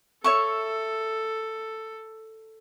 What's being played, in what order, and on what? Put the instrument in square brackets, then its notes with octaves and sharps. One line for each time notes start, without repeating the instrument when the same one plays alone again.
[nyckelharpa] A4 [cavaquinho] C#5 E5 C#6